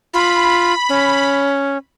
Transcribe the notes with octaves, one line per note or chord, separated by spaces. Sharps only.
F4 B5
C#4